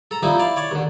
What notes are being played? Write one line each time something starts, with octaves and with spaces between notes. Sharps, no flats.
A4 A#5
F3 G3 A#3 C4 D#4 E4
E4 D5 F5
C#5 D5 A5
D#2 D3